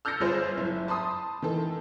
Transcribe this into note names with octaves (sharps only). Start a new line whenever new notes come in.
E6 F6 G6 A6 A#6 C#7
G1 F4 G#4 B4 C5
F#1 E4
A5 B5 C6 D#6
D#3 E3 A4